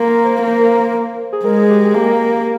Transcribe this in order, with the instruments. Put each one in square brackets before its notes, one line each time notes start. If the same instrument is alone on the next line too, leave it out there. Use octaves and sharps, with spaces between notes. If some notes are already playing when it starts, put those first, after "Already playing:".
Already playing: [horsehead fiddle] A#3 [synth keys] C6
[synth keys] A#5
C5
[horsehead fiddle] A#3 [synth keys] A#4
[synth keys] C5
G#4
[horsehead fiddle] G#3 [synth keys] A#4
[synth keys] G#4
G4
G#4
[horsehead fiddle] A#3 [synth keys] G4